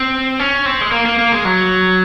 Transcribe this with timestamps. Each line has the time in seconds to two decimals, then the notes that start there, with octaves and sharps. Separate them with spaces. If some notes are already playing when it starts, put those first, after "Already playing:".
Already playing: C4
0.39 C#4
0.66 C4
0.81 G#3
0.92 A#3
1.06 A#3
1.19 A#3
1.32 G#3
1.45 F#3